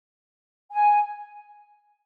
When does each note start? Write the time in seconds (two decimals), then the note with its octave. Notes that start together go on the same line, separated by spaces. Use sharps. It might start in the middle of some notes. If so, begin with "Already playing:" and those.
0.71 G#5